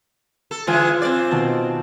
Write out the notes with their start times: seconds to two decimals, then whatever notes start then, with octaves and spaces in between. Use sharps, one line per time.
0.51 A4
0.67 D3 E3 G#3 F4 G#5
1.02 C4 D5
1.31 B2 D#3 A5